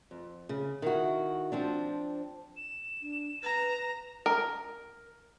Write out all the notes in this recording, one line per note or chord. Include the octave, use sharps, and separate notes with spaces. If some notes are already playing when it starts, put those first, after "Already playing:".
F2
C#3
D#3 E4 F#4
F3 C4 D4
E7
D4
B4 A#5
A#4